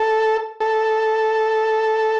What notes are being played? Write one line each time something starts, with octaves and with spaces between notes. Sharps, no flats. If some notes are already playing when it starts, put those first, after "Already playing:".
Already playing: A4
A4